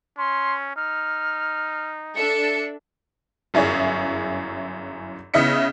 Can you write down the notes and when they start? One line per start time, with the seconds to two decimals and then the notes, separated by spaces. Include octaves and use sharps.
0.18 C#4 C6
0.76 D#4 F6
2.16 D4 A4 E5 C#7
3.54 G1 F#2 E4 G#4 C#5
5.34 C#3 B3 E4 D#5 B6 C#7